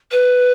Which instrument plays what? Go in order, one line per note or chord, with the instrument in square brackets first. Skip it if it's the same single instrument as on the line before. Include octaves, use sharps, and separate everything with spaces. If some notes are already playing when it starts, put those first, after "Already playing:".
[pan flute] B4